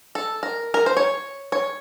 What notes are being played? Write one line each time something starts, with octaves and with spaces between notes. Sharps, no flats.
A4
A#4
A#4
C5
C#5
C#5